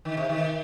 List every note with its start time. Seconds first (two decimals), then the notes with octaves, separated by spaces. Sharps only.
0.05 D#3
0.17 C3
0.29 D#3